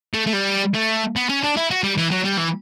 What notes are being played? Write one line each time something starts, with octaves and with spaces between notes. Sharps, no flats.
A3
A3
G3
A3
B3
C#4
D4
E4
F#4
G3
E3
F#3
G3
E3